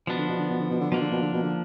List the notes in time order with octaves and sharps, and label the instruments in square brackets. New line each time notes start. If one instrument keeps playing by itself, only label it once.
[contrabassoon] B2 [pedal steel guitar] F3 B3 D4
[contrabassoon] D3
B2
D3
B2
D3
B2
D3
[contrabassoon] B2 [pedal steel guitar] F3 A#3 D4
[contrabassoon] D3
B2
D3
B2
D3